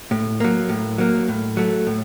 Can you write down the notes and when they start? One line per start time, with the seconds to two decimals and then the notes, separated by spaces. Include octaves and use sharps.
0.11 A2
0.40 F#3 A#3
0.69 A2
0.98 F#3 A#3
1.28 A2
1.57 F#3 A3
1.87 A2